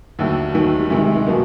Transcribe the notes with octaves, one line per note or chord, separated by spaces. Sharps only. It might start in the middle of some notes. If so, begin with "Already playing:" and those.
D#2 D3 F#3 A3
D#2 D#3 F#3
G3
D2 C3 D#3 G#3
G#3
G#3
B2 F#3 A#3